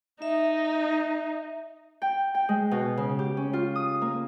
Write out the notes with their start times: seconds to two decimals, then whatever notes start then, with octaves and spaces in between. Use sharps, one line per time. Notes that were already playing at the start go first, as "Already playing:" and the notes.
0.22 D#4 E5
2.02 G5
2.35 G5
2.49 G#3
2.71 B2
2.97 C#3
3.19 G4
3.37 C#4
3.53 F4
3.76 D#6
4.02 A#3